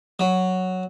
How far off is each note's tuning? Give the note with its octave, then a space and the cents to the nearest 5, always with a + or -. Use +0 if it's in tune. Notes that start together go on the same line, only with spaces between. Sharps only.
F#3 +0